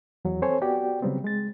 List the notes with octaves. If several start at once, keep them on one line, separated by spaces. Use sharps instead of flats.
E2 F#3
C4 A4 C5 C#5 G#5
B3 F#4 G4 D5 G5
C#3 F#3 G3 B3 C4
G#3 A6